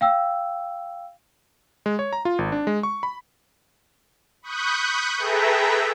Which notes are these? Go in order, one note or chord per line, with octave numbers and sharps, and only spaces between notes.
F5 G5 E6
G#3
C#5
A#5
F4
G#1
D4
G#3
C#6
B5
B5 C#6 D#6 F#6 G6
G#4 A4 B4 E5 G5 A#5